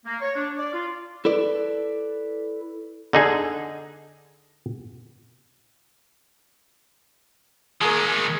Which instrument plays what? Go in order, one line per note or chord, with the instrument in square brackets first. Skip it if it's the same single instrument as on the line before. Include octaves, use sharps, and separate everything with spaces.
[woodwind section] A#3
C#5
D4
D5
F4
[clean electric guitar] E4 A4 B4 D5
[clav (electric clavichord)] D3 D#4 G#4
[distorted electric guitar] D#3 G#3 [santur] A#3 G#4